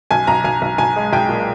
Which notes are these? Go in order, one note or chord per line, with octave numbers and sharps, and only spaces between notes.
B1 G#5
B1 A#5
B1 G#5
B1
B1 G#5
G#3
B1 G5
A#2